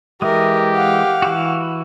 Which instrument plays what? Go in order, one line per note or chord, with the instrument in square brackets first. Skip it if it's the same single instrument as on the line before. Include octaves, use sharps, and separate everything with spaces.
[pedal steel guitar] E3 G#3 [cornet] G4 [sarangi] A#4 [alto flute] E5
[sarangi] F5 [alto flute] F#5
[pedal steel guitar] E3 E4 F#4